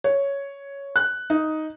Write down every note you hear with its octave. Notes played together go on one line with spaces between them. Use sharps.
C#5
F#6
D#4